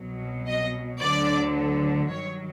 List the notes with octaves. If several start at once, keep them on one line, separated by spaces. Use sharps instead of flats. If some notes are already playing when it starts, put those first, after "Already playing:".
Already playing: C2 B2 F#3
D#5
D2 D3 F#3 D5
G2 D#3 F#3 C#5